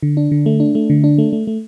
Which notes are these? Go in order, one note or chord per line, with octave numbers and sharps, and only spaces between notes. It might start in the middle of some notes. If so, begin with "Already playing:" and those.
D3
D4
D3
A3
D4
A3
D3
D4
A3
A3
A3